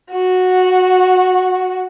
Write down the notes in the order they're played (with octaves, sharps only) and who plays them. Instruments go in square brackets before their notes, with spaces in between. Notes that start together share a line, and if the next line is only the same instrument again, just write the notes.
[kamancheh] F#4